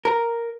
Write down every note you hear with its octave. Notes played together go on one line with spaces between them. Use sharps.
A#4